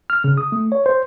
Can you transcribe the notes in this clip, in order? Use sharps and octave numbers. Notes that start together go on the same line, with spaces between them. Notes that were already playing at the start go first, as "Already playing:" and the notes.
F6
C#3
D#6
A3
C#5
C5